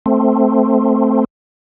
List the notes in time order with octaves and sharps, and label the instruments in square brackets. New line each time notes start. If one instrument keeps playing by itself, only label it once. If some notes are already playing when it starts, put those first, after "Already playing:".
[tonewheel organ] A3 C4